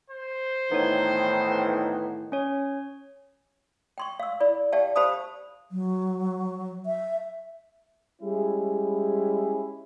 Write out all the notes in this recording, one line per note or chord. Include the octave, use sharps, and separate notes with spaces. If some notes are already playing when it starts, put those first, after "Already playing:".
C5
A2 D#3 E3 B3 D#4 C#5
C#4 C#5
G5 C6 C#6
F5 E6
E4 D5 B5
G4 D5 E5 F5 G5 A5
G4 C5 F5 A5 B5 D#6
F#3
E5
G3 G#3 C#4 E4 G4 G#4